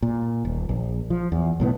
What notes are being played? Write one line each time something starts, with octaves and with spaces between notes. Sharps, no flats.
A#2
D#1
A#1
F3
E2
B1 A2 D3 B3